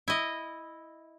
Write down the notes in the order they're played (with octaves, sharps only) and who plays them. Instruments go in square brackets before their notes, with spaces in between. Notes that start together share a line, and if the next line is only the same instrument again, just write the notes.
[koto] E4 D#5